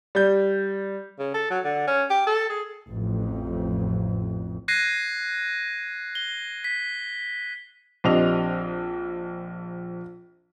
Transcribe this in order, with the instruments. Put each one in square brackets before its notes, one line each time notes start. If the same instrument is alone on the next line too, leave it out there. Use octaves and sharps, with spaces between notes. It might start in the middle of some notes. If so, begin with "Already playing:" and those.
[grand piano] G3 G6
[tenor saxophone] C#3
A4
F#3
D3
C#4
G4
A4
G#4
[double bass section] A1 F2
[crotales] F#6 G#6 A#6 C7 D#7
G7
B6
[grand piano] A#1 C4 D4 G4 D#5 F7